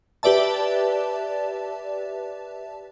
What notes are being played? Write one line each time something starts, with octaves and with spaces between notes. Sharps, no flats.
G4 B4 D5 E5 A5